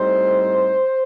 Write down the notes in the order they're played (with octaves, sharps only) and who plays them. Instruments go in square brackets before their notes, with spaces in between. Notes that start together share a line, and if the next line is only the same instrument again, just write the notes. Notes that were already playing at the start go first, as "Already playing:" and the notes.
Already playing: [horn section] A2 G3 C4 D#4 C5